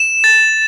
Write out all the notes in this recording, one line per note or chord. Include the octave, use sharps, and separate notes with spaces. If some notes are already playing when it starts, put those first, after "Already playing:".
Already playing: E7
A6